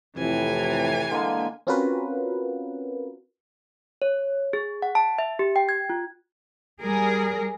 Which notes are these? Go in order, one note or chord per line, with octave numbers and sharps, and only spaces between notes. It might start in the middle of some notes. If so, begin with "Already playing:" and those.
F2 A2 C3 E3 G#5
D3 G#3 A#3
C4 C#4 F4 F#4 A#4 B4
C#5
G#4
F#5
A5
E5
G4
G5
G#6
F4
G3 G#4 A#4